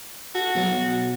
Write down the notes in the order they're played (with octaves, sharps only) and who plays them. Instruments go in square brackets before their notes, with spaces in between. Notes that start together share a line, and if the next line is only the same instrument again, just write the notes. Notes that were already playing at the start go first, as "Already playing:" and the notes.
[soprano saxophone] F#4 [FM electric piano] A4
[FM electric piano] B2 F#3 A6